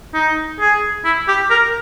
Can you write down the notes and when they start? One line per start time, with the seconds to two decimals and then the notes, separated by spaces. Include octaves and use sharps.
0.14 D#4
0.60 G#4
1.05 E4
1.28 G4
1.50 A#4